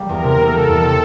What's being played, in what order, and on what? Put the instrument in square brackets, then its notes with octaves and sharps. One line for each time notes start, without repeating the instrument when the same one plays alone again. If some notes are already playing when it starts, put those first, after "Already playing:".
Already playing: [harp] G3 A#3
[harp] E2 [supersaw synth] A#4
[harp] C3
[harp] A#3 [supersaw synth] A4
[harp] G3
E2
C3